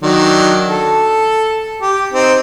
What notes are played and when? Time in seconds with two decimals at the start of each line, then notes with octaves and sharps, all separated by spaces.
0.03 D#3 F#3 D4
0.68 A4
1.81 G4
2.12 C4 D#4